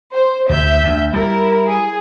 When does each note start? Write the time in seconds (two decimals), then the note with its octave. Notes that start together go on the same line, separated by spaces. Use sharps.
0.13 C5
0.50 D2 E5 G6
0.83 D2
1.13 G3 E4 A#4
1.69 G#4